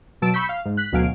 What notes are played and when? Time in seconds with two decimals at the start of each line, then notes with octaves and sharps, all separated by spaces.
0.22 B2 F#3 A5 E6 D7
0.34 B5 C#6 E6 G6 B6
0.49 F5
0.65 G#2
0.77 F#6 B6
0.92 D2 B2 F#3 F5 G#5 D7